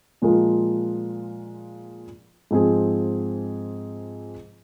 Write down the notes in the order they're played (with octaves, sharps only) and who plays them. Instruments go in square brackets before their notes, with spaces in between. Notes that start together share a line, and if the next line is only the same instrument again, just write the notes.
[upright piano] A#2 F3 G#3 F4 A#4
G#2 F3 C4 G#4